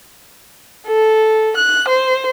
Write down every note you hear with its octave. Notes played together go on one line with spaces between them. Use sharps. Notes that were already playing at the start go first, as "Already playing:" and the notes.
A4
F#6
C5